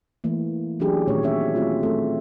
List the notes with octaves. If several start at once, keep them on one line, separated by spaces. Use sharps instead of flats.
E3 A3 A#3
E3 F#3 C#4 D4 G4 G#4
A#2 D#3 A3 B3 C#4 C#5
C4 C#4 D#4 F#4 C#5 E5
A3 C4 F4 G#4
A3 C4 A4